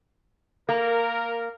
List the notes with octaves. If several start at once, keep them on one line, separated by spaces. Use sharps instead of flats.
A#3 A#4